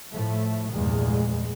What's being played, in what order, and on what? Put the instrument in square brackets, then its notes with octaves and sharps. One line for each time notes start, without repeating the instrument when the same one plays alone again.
[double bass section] A2 F3 A3
F1 E2 G2 A#2 G#3